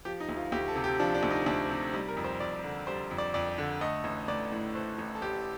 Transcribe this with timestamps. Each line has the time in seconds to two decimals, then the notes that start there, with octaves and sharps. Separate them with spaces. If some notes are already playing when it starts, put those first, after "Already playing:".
0.05 F3 G4
0.20 D#4
0.29 D2
0.37 F4
0.52 D2 G4
0.68 A4
0.76 C3
0.84 G4
1.00 F3 D4
1.14 D4
1.23 D2
1.30 D#4
1.46 D2 D4
1.70 C3
1.93 G3 D#4
2.09 A#4
2.17 F2
2.24 C5
2.40 F2 D5
2.64 D3
2.87 G3 C5
3.11 F2
3.18 D5
3.34 F2 D5
3.58 D3
3.81 A3 D#5
4.04 A1
4.28 A1 D5
4.52 A2
4.75 A3 C5
4.98 A1
5.15 A4
5.22 A1 G4